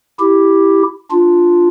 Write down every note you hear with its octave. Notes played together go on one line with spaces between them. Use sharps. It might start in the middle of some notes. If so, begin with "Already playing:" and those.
E4 G4
D4 F4